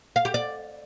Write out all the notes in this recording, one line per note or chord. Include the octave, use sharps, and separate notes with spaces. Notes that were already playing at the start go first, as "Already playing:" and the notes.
F5
G4
D5